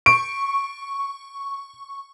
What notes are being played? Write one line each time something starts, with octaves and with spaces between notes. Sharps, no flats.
C#6 D7